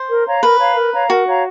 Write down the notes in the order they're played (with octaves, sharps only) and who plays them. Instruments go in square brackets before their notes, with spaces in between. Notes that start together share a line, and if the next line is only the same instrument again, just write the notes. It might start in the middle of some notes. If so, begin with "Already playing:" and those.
Already playing: [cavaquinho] C5
[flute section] A#4
C#5 F5 A#5
[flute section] A#4 [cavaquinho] B4
[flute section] C#5 F5 A#5
A#4
C#5 F5 A#5
[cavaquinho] F#4 [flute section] A#4
[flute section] C#5 F5 A#5